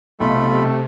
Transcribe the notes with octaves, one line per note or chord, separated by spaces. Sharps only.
B1 C3 A3 F4 B5